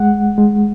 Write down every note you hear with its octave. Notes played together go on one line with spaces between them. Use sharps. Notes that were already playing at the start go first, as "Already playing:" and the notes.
Already playing: G#3 F#5
G#3